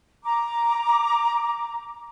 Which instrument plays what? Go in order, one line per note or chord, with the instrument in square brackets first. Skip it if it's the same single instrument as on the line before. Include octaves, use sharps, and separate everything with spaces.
[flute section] A#5 D6